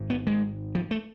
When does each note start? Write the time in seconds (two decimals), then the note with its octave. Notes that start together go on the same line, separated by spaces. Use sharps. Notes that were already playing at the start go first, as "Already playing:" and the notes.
Already playing: G#1 G#2
0.10 B3
0.27 G#3
0.75 F3
0.91 A3